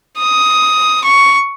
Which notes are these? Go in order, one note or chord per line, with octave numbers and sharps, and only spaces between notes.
D#6
C#6